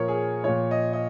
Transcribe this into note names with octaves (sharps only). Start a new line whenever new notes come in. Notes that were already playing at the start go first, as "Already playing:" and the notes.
Already playing: A#2 F3 A#4 C#5
G#4
A#2 F3 C#5
D#5
D#5